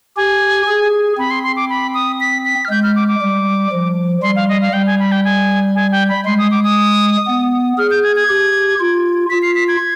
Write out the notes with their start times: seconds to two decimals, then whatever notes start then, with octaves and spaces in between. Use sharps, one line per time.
0.17 G4 G#5
0.67 G#4
1.18 C4 B5
1.31 C6
1.43 C6
1.56 D6
1.70 B5
1.94 D#6
2.20 B6
2.45 B6
2.65 F6
2.70 G#3 G6
2.83 F6
2.96 D6
3.08 D6
3.21 G3
3.72 F3
4.22 G3 C6
4.36 F5
4.49 D#5
4.61 F5
4.73 G3 G5
4.87 G#5
5.00 B5
5.12 G5
5.24 G#5
5.75 G#5
5.92 G5
6.09 B5
6.25 G#3 C6
6.39 D#6
6.51 D6
6.64 D#6
7.27 B3
7.78 G#4 F6
7.91 G6
8.04 G#6
8.16 G#6
8.29 G4
8.80 F4
9.30 F4 B6
9.43 C7
9.55 B6
9.68 G#6